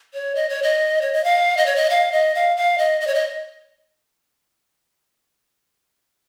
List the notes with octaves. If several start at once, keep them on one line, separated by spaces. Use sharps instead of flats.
C#5
D#5
C#5
D#5
C#5
D#5
F5
D#5
C#5
D#5
F5
D#5
F5
F5
D#5
D#5
C#5
D#5